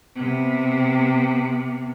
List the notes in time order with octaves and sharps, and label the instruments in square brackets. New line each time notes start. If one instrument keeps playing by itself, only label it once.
[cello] C3 B3